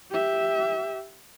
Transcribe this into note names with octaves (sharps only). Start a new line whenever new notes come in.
G4 E5